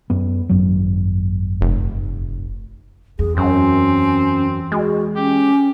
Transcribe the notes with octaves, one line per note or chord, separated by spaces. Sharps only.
F#2 B3
G#1 F#2 F#3
F1
E2 G#4
F#2 C4 C#4
G#3 F#4
C#4 G4